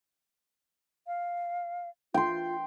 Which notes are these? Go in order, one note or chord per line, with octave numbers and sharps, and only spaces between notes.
F5
F4 G5 C6